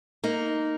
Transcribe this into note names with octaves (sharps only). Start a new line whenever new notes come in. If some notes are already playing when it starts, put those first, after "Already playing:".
A#3 D#4